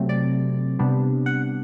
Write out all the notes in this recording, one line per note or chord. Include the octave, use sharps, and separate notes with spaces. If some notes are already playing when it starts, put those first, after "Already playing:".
Already playing: C3 F#3 A3 C4
D5
C3 G3 B3 D4
F#5